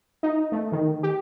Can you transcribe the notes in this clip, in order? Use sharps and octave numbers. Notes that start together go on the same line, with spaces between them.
D#4
A3
D#3
G4